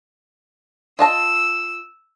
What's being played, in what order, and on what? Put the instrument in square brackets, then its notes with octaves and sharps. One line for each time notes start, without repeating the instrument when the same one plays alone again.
[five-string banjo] F4 D#5 A5 [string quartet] E6